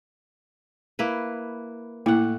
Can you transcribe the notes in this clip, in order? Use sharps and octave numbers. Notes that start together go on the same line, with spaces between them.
A#3 E4 B4
A2 A#3 E4 F#5